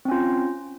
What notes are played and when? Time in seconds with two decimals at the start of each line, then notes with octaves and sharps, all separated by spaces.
0.05 C4
0.08 C#4
0.11 F4